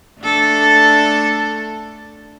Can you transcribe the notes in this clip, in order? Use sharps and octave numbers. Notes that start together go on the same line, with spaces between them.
A3 D4 A4